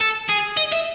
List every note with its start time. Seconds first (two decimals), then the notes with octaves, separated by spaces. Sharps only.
0.01 A4
0.29 G#4
0.57 D#5
0.72 E5